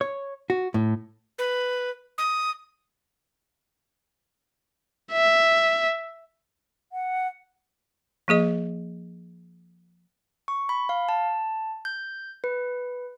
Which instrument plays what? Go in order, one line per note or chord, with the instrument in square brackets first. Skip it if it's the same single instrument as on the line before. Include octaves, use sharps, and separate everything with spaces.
[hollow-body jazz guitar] C#5
F#4
A2
[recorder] B4
D#6
[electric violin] E5
[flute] F#5
[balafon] F3 A#3 G#4 D#5
[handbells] C#6
B5
F5
A5
G6
B4